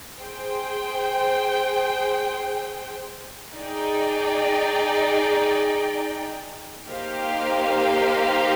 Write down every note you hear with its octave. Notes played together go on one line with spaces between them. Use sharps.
G#4 C5 G5
D#4 G#4 D5 G5
A#3 D#4 G4 C5 F5